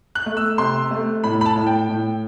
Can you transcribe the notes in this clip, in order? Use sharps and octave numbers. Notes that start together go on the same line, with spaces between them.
F#6
A3
E6
C3 C6
A3
A2 B5
B5
A5
A2
G5
A2